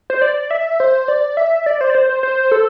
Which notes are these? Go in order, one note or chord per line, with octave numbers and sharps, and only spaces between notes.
C5
D5
E5
C5
D5
E5
D5
C5
D5
C5
C5
C5
A4